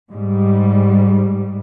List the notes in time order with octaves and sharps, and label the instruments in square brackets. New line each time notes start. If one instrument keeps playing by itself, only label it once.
[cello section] G#2 G3